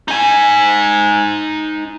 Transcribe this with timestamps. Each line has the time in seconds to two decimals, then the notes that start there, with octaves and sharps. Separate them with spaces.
0.08 D#4 G#5